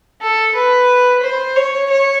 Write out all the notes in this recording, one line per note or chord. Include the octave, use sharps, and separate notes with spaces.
A4
B4
C5
C#5
C#5